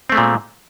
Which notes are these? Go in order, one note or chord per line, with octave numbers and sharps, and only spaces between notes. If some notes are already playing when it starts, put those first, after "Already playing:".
A#2 G#3 A3 C4